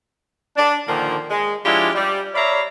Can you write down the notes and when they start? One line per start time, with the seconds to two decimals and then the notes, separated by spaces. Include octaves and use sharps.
0.57 D4
0.88 A#2 D3 D#3 F3 A#3
1.31 G#3
1.66 F3 G#3 D4 E4 F4 G4
1.95 G3
2.35 C#5 D5 E5 F5 A#5 B5